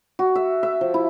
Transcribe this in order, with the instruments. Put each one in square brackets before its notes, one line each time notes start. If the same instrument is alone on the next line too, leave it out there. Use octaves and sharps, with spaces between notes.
[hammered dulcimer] F#4
E5
E5
F3
E4